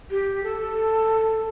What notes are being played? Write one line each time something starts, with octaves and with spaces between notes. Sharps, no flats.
G4
A4